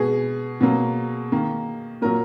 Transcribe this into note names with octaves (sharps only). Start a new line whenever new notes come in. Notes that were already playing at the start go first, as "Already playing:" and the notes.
Already playing: B2 G#3 B3 G#4
B2 F#3 A#3
D#3 A#3
A#2 F#3 A#3 A#4